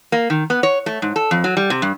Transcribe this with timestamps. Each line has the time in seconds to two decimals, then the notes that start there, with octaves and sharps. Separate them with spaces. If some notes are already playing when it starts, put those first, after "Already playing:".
0.12 A#3
0.30 D#3
0.50 B3
0.63 C#5
0.86 A3
1.02 G#2
1.16 A4
1.31 F2
1.44 F#3
1.57 G3
1.70 C3
1.82 G2